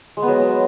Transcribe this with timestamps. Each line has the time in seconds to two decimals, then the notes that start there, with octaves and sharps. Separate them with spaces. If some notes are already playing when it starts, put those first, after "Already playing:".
0.17 G#3
0.22 B3
0.28 F#3